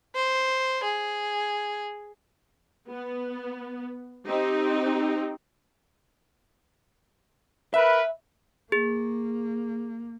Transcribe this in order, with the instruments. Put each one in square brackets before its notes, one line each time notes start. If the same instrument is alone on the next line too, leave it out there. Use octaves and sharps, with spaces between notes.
[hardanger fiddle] C5
G#4
[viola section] B3
C4 D#4 G4
[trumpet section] A#4 B4 [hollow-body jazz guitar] E5
[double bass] A#3 [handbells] G#4